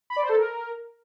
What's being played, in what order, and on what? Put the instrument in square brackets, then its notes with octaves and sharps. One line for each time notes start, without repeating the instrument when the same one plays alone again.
[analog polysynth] B5
D5
C5
A4
A#4